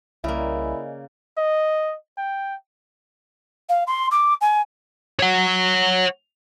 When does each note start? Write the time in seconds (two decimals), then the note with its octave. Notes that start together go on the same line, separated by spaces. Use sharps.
0.24 C2 C#3 A#3 E4 D5 D#5 G#5
1.37 D#5
2.17 G5
3.69 F5
3.87 C6
4.11 D6
4.41 G#5
5.20 C#5 F#5